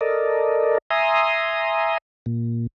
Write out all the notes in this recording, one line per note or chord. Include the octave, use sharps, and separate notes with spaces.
A4 A#4 D5 D#5
E5 G#5 A#5 C6 D#6
A#2